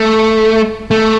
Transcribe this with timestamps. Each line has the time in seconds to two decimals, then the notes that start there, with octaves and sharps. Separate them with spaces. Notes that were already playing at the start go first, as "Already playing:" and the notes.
Already playing: A3
0.91 A3